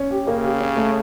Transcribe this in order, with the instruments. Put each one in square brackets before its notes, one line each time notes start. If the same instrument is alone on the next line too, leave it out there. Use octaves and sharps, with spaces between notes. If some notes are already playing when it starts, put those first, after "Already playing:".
Already playing: [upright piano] C#4
G4
[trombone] C#3 [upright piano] A#3
[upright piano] G4
C#4
A3